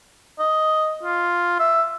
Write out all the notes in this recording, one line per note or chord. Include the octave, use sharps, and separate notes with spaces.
D#5
F4
E5